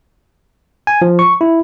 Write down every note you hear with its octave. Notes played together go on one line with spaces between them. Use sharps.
G#5
F3
C#6
E4